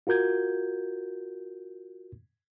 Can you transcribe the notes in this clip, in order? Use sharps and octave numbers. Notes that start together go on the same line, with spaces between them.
F4 F#4 A#4 G6 G#6